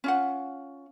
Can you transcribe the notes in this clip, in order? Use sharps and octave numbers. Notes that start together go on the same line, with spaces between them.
C#4 F4 F#5